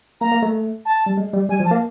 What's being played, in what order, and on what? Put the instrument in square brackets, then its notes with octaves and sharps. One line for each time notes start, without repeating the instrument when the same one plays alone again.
[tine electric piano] A#3 [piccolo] A#5
[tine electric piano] A#3
A3
[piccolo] A5
[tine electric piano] G3
G#3
G3
[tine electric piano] G3 [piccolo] G#5
[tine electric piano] F3
[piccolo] A5
[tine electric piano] A#3